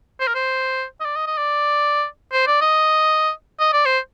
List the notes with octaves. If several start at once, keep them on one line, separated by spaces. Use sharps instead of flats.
C5
A#4
C5
D#5
D5
D#5
D#5
D5
C5
D5
D#5
D#5
D5
C5